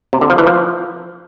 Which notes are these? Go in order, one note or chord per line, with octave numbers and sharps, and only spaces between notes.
C3
D3
F3
E3
F3